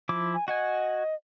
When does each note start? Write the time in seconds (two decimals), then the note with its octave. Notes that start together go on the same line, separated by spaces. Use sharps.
0.09 F3 E4 D6
0.34 G#5
0.48 F#4 D#5 F#5 G#5